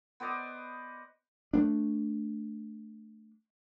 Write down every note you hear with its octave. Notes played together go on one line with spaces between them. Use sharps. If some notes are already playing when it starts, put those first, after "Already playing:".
B3 C5 D5 D#5
A3 B3 D4